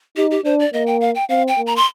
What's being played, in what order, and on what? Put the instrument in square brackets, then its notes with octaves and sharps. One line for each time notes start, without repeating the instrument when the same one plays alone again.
[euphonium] D#4 [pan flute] G4
[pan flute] G4
[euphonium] D4 [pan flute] C5
[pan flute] D5
[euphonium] A#3 [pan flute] D#5
[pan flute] G5
F5
G5
[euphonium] C4 [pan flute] F5
[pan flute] G5
[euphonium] A#3
[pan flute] A#5
C6